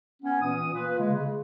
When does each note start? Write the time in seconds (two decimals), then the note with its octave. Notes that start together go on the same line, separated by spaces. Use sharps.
0.23 B3 C#4
0.42 A#2 E3 D#6
0.74 A#3 F4 B4
0.99 C#3 G#3
1.12 C#3